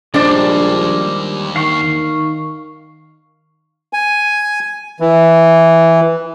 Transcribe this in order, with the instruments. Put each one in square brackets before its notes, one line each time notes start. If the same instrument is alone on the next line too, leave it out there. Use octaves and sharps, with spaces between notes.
[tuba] A#1 [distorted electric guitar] D#2 [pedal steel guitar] G3 G#3 [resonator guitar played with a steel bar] D4 C5 D5
[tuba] D#3 [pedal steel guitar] F5 C#6
[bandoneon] G#5
E3